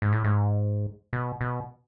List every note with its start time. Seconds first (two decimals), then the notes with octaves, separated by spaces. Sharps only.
0.02 G#2
0.12 A2
0.24 G#2
1.13 B2
1.41 B2